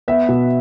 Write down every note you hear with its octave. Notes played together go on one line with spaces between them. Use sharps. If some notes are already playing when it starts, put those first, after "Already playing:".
B3 E5
B2